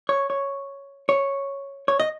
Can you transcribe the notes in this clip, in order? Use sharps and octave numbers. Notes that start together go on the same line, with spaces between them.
C#5
C#5
C#5
C#5
D#5